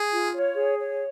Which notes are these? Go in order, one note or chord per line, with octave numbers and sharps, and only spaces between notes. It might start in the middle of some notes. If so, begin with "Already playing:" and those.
Already playing: G#4
F4
C#5
G#4
C#5